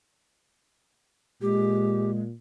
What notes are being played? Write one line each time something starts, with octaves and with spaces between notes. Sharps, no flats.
A#2 G#3 G4